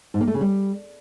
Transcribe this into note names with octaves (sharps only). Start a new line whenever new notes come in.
G#2
A#3
A3
C#3
G3